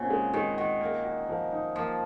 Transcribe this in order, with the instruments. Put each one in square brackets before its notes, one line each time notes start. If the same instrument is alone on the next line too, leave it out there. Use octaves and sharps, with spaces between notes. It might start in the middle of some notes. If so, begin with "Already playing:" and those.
Already playing: [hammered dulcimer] A#2 C#3 [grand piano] C4 F#4
[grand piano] G#3
[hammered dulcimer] D#3 [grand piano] G#3
[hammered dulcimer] D#3 [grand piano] F#4
[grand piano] A#3
F#4
F3
D#4
[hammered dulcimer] F3 [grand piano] A#3